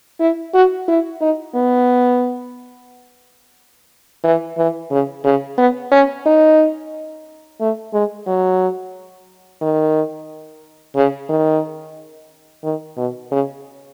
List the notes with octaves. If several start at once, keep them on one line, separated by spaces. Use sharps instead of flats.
E4
F#4
E4
D#4
B3
E3
E3
C#3
C#3
B3
C#4
D#4
A3
G#3
F#3
D#3
C#3
D#3
D#3
B2
C#3